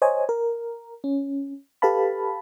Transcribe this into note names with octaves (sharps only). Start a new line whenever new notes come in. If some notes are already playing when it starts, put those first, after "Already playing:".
C5 C#5 D#5 G#5
A#4
C#4
G4 A4 B4 F5 A5 B5